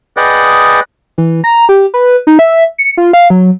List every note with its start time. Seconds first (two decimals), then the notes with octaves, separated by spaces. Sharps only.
0.17 G#4 B4 D5 D#5 F#5 G5
1.18 E3
1.44 A#5
1.69 G4
1.94 B4
2.27 D#4
2.39 E5
2.78 C#7
2.97 F4
3.13 F5
3.30 F#3